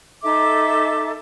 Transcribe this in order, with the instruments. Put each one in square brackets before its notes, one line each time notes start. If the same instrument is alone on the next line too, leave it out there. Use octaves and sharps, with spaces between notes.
[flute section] D#4 A4 E5 D6